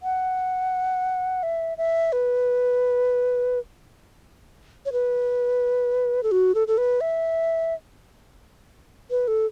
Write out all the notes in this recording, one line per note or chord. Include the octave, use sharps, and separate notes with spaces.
F#5
E5
E5
B4
C#5
B4
A4
F#4
A4
A4
B4
E5
B4
A4